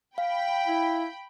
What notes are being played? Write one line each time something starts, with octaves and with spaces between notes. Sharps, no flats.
F5 G5 B5
E4